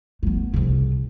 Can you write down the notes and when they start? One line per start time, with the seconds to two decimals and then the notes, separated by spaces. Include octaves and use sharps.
0.23 A3 B3
0.54 C2 C#3